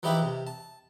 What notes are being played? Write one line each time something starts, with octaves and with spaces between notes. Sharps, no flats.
E3 F3 D#4 E4 G4 B4
C3
A5